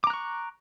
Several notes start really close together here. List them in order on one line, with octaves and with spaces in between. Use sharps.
D6 A#5 F#6 C#6